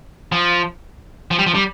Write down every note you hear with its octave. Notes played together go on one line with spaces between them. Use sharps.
F3
F3
G3
F3
G3